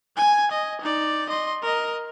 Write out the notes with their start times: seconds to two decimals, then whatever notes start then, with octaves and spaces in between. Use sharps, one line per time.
0.16 G#5 G#6
0.52 D#5
0.81 D#4 D5
1.29 D#5 C6
1.62 A#4 D#5